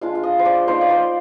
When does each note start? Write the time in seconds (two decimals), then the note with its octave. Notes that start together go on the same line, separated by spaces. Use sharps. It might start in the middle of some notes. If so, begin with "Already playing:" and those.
0.01 G#3 D4 F4 F5
0.15 F5
0.23 D#5
0.39 C5
0.45 D5
0.67 A#3 D#4 C5
0.81 D5
0.90 C5